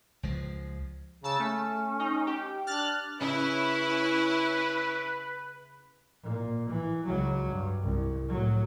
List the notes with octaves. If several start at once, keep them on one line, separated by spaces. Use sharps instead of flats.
C#2 F3 G#3
C#3 A5 E6
A3 C#4
D#4
G4
D4 F6 F#6 A6
C#3 C#4 E4 B4
A#2
E3
C#2 F#3
G2
C2
A2 F#3